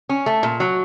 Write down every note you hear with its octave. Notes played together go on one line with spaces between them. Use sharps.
C#4
A3
A#2
F#3